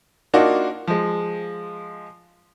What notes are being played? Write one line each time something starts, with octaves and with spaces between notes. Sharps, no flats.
A#3 D4 D#4 F4 F#4 A#4
F3 G#3